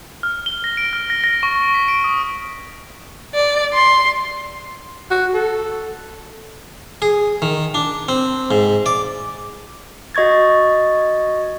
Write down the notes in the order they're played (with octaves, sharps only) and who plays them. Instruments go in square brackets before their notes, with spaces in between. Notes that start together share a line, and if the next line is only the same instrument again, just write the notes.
[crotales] F6
G7
A#6
D7
F6
A#6
A#6
C#6
D7
B6
D7
D#6
[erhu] D5
C6
[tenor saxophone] F#4
A4
[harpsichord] G#4
D#3
D4
C4
G#2
D5
[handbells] F#4 D#5 C#6 G#6 A6